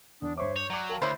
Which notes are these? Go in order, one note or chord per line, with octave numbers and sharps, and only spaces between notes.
E2 D4 D#6
G2 C5 C#5 E5 C#6 D6
C#5 G6
F#3 D5 G#5 D6
A#4 F5 G5 A5
D2 E4 C5 C#5 B5 D6